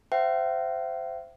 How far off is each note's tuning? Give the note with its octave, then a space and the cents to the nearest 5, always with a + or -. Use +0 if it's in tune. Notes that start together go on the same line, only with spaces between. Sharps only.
C5 -10 E5 +35 G5 -45